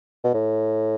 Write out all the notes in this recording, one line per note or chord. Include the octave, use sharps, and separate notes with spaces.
B2
A2